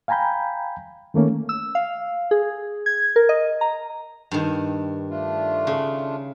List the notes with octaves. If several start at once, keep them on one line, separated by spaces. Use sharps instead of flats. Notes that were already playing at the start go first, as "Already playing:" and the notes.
F5 G5 G#5 A#5 B5 G6
D#3 A3 A#3 C#4
E6
F5
G#4
G#6
A#4
D#5
A#5
G2 D#3
A3 D4 F4
C#3